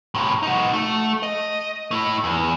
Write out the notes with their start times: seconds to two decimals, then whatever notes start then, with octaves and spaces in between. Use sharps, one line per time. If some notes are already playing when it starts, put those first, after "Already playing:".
0.15 A2 C3
0.43 D#4 F#4
0.73 A3
1.23 D#5
1.91 A3 E4
2.24 E2